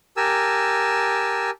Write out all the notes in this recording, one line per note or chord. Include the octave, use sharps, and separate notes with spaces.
G4 A#4 G#5 A5 E6